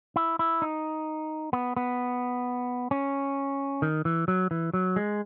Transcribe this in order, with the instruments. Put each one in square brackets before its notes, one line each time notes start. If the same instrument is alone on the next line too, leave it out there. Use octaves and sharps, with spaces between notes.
[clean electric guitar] E4
E4
D#4
B3
B3
C#4
D#3
E3
F#3
E3
F#3
G#3